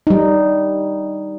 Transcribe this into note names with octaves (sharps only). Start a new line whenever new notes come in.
G3 D#4